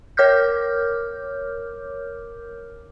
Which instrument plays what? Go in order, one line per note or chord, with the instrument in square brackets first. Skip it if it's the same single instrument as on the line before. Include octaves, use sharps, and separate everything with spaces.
[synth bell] A#4 C#5 D6 F6 G6